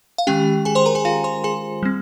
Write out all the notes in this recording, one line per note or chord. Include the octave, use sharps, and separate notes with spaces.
F5
D#3 G#3 C#4 G4 G5
G#4 G#5
C5 C6
A#4 A#5
G#4 G#5
F4 F5
C5 C6
G#4 G#5
G3 C4